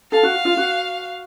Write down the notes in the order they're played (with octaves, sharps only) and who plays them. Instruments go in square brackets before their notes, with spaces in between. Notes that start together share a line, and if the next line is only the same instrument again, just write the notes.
[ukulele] A4 [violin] F5
[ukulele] F#4
F4
F#4